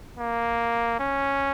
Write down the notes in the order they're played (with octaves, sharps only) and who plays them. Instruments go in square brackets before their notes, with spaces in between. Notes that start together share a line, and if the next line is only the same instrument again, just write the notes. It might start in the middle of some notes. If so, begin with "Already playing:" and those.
[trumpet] A#3
C#4